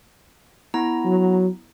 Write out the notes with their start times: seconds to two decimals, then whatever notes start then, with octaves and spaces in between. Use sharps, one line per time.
0.74 B3 E4 A#5
1.05 F#3